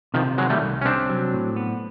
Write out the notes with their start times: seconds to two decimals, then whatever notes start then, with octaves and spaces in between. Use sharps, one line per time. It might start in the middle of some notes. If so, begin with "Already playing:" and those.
0.14 C3 D#3 F3
0.37 D#3 F#3 G#3
0.50 G3 A3
0.62 C2
0.81 C#4
0.85 C3 C4 D4
1.10 F#3
1.34 A2
1.56 B3